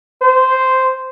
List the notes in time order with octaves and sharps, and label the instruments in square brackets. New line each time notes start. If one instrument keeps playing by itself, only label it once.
[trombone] C5